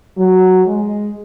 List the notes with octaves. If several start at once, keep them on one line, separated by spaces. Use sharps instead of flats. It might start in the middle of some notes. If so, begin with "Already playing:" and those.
F#3
G#3